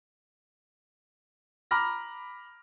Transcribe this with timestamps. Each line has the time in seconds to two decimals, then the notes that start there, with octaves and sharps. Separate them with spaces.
1.71 A#5 B5 D6 F6 A#6